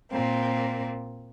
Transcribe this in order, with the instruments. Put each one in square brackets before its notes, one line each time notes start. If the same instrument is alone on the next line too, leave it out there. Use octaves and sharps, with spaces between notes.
[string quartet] A#2 A#3 C4